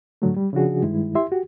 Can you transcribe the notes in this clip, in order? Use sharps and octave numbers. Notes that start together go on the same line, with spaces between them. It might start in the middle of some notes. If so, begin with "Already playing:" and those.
A2 D3 F#3 A3
G3
C#3 F3 D4 F#4 G#4
G2 D#3 G#3 E4
E4 G4 E5 C6
F#4 G4